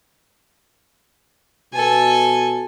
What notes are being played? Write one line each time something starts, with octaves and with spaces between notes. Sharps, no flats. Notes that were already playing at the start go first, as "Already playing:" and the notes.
B2 A4 G#5